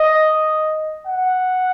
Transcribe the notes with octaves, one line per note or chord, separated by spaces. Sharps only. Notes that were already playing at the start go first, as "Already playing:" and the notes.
Already playing: D#5
F#5